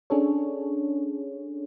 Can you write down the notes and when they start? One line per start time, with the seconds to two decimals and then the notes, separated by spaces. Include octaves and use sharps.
0.10 C#4 D4 G#4 A4 C#5